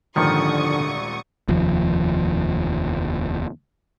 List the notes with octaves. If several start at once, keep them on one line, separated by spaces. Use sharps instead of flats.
D#1 G#1 A#2 D3 D#3 F3 C#6 D#6
F1 D#2 F3